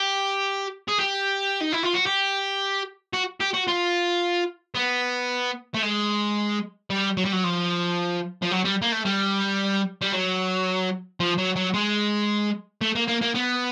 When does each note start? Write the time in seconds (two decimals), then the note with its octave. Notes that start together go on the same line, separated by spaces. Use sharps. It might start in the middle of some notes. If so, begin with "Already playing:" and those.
Already playing: G4
0.88 G#4
0.99 G4
1.61 D#4
1.73 E4
1.83 F4
1.94 F#4
2.07 G4
3.14 F#4
3.41 G4
3.54 F#4
3.68 F4
4.75 B3
5.74 A3
5.82 G#3
6.90 G3
7.17 F#3
7.25 G3
7.33 F#3
7.44 F3
8.42 F3
8.51 F#3
8.65 G3
8.82 A#3
8.92 A3
9.05 G3
10.02 G3
10.13 F#3
11.20 F3
11.38 F#3
11.56 F#3
11.74 G#3
12.81 A3
12.95 A#3
13.08 A#3
13.22 A#3
13.35 B3